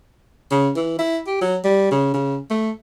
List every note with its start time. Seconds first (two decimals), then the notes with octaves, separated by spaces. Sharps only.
0.51 C#3
0.76 E3
0.99 E4
1.27 G4
1.41 F#3
1.64 G3
1.91 C#3
2.14 C#3
2.50 A3